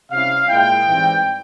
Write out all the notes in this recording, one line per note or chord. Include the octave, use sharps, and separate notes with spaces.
C3 G3 C#4 E4 F5
A#2 G#3 E4 G5
G#2 E3 G3 C4